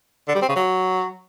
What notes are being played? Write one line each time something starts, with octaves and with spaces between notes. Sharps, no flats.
D3
G3
C4
C#3
F#3